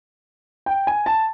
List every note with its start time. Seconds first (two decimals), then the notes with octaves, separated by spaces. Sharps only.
0.66 G5
0.87 G#5
1.06 A5